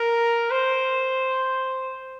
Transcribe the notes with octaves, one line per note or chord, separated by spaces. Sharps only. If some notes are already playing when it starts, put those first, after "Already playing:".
Already playing: A#4
C5